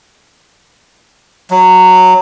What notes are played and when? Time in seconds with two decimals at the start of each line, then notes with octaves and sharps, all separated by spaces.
1.51 F#3